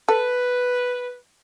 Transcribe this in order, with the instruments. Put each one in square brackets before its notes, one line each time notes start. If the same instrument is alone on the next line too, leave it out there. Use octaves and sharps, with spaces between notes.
[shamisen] A4 [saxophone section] B4